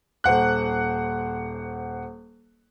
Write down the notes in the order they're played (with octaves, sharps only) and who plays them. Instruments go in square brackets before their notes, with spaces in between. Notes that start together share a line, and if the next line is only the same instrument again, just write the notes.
[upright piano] D#1 C5 F#5 F#6